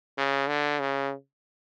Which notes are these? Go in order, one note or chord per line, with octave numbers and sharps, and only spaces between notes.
C#3
D3
C#3